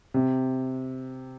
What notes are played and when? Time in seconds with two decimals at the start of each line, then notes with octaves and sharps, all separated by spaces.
0.14 C3